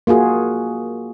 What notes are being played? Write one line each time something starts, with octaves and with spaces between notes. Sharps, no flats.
A#3 F4 F#4 G#4